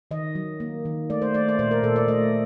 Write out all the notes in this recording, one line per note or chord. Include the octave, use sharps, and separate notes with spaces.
D#3 D#5
F#3
A#3
D#3
A3 D5
C5
A3 D5
D5
A#2 C5
A#4
A#2 A4
D5
A3 D#5